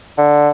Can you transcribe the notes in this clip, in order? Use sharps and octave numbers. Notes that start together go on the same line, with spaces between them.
D3